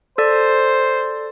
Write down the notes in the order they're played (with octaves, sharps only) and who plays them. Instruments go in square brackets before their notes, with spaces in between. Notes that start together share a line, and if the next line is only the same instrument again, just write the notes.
[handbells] A4 D5 [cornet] C5